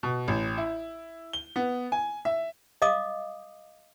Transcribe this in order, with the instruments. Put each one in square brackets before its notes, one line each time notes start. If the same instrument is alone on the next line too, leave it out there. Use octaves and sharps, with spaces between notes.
[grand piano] B2
A1
E4
G7
B3
G#5
E5
[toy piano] D#5 F5 D6 D#6